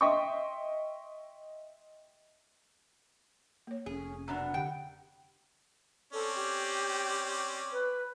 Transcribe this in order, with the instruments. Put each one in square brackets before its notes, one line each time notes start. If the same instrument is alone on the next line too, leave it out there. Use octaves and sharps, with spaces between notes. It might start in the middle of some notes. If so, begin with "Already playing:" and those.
[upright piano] D#5 E5 G5 C6 C#6
[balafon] A#3 C#5
[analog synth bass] F1 [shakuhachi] C#4 [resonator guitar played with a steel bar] G#4
[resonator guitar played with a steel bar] F#2 B2 D4 [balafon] D5 A#5 [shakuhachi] F#5
[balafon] D3 G4 [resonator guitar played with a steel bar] G5
[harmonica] C4 C#4 D5 [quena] A4
[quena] G4
B4